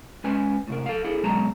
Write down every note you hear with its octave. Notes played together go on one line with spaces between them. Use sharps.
G#3 C#4 B4 G#5
A2 C3 A#4
A4 F5
E4 G#4 A4
B2 F#3 G#3 B3 A5 A#5